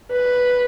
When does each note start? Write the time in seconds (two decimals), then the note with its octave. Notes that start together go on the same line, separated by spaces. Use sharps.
0.12 B4